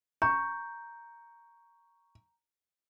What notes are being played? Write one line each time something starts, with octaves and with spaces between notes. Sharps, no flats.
A#5 C#6 G6